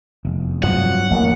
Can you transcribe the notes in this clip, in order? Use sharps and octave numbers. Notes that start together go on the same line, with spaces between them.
F1 E2
G2 F3 F#3 F#5
A1 E2 G2 F#3 A#3